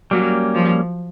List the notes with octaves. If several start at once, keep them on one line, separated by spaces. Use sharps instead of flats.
F#3 G3 A#3 C#4
F3